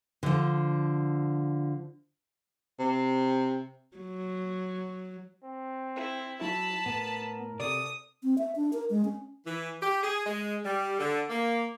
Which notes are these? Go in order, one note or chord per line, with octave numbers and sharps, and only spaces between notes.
D3 F3
C3
F#3
C4
E4
F#3 E4 E5 A5 B5
A2 B3 A#4
C3 A4 D5 D#6
C4
E5
D4
A#4
G#3
C#4
E3
G4
G#4
G#3
G3
D3
A#3